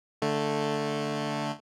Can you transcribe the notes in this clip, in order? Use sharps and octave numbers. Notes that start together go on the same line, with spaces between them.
D3 A3